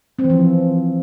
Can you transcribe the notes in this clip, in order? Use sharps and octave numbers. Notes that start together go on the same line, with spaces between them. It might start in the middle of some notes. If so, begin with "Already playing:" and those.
C4
E3
F3